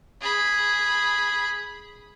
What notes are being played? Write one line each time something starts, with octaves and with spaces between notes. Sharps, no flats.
G#4 B5